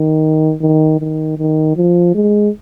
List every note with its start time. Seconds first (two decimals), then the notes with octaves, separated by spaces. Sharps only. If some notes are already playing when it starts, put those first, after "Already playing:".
Already playing: D#3
0.61 D#3
1.00 D#3
1.38 D#3
1.76 F3
2.15 G#3